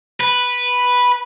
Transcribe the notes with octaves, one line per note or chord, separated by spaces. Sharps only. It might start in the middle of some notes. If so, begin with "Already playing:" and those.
B4